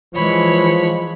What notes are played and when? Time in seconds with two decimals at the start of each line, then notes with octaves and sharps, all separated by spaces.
0.15 E3 F3 G#3 C#5 B5